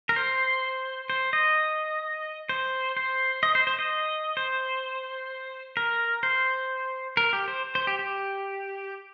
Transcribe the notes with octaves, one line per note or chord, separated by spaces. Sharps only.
A#4
C5
C5
D#5
C5
C5
D#5
C5
C5
D#5
C5
A#4
C5
A#4
G4
C5
C5
G4
G4